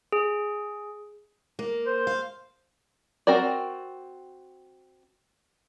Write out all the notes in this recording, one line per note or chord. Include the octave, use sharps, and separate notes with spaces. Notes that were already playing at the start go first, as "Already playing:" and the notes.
G#4
A#3
C5
F5
C4 F#4 A#4 D5